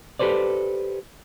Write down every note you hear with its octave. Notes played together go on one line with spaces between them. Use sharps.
G4 A4 B4 C5 D5